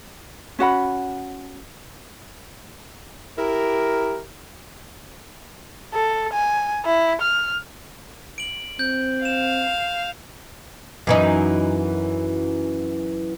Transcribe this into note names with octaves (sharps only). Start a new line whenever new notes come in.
C#4 F#4 F#5 B5
E4 G4 A#4
A4
G#5
E4
F6
D7 F#7
C4 G6
F5 E7
F#2 E3 D#4